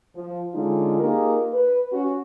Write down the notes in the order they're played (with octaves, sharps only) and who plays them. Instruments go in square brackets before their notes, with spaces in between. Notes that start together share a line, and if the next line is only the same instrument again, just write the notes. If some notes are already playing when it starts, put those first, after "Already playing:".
[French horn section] F3
D3 G#3 C#4 D#4 F4
A#3 D#4 F4 G4 G#4 A#4
B4
C#4 F#4